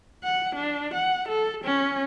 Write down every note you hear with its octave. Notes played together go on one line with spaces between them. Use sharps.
F#5
D4
F#5
A4
C#4